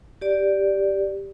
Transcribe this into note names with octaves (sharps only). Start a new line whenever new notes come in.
G4 D5